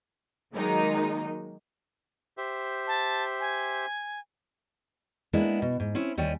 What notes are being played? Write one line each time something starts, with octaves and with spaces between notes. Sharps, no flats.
D#3 F#3 G#3 A#3 D#4
G4 C5 E5
A5
G#5
G#3 A#3 B3 D4 E4
B2
G#2
C4 C#4 E4
D#2 G3 C#5 G5 G#5